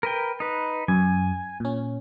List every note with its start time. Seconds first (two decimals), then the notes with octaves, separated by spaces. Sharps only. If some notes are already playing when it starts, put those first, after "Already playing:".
0.03 A#4 B4 G5
0.40 D#4 B4
0.88 F#2 G#5
1.60 A#2 C#4